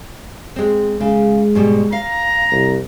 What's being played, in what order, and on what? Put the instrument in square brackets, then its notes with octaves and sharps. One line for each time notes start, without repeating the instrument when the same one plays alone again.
[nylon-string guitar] G#3 C4
[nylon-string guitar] C#3 [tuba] G#3
[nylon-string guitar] G#2 B2 G3
[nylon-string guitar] F5 [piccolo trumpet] A#5
[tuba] C2